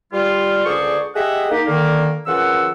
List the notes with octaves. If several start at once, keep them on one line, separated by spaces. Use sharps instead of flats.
G3 F4
C#2 D3 G#4 C5 D5 C#6
G4 G#4 D#5 E5 F#5
A#3 D#4 G4
D3 D#3 A#3
F#2 C#3 E3 F4 F#5 E6